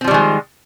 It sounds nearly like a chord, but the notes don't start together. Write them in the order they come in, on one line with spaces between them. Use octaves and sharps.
C4 F3 G3 D#3 G#3